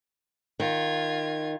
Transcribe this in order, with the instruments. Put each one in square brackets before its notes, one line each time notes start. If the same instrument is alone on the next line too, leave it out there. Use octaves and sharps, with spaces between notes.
[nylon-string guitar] D#3 [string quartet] F4 G#6